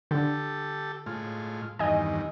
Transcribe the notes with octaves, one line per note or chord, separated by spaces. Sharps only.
D3 G4 A4
A2 G#3 F4
E2 G2 D#3 D#5 G#5